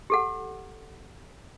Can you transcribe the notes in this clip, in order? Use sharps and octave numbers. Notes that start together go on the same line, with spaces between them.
G4 A4 F#5